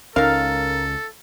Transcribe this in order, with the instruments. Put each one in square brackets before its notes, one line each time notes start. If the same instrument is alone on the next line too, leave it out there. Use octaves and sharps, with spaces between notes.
[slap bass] C#2 C#4 [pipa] D#4 F5 [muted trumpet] A4 [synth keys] A#4